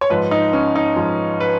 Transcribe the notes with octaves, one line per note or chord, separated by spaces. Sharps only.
C#5
G#2 F3 B4
D#4
C#4
D#4
G#2 F3
B4